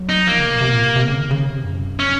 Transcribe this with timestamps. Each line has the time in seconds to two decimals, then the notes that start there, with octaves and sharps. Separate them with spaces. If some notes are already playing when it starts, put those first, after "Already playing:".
Already playing: F#3
0.09 D#4
0.26 F3 A#3
0.38 C#3
0.45 C3
0.55 A#2
0.61 C3
0.72 A#2
0.85 C3
0.96 C3
1.07 C#3
1.19 D#3
1.31 C#3
1.48 C3
1.64 F#2
1.99 C#4